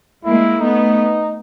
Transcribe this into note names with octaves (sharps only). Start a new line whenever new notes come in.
G#3 A#3 E4
A3 B3 D#4